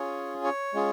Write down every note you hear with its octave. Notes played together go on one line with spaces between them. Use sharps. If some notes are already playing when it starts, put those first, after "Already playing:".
Already playing: C#4 F4 G#4 C#5
C#5
G#3 C#4 F4 G#4